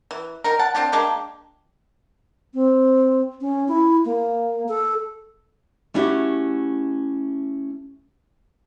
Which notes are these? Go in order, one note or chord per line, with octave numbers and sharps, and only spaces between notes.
E3
D#3 A#4
F#5 A5
C4 D4 F4 G4
G#3 A#3 D4 G4
C4
C#4
E4
A#3
A4
A3 C#4 D4 E4 F#4 G4